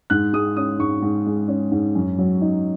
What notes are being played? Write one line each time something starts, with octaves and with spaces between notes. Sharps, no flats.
G#2 F#6
G#3 D#6
C#4 D#6
G#2 C#6
G#2
G#3
C#4
G#2
F#2
F#3
D#4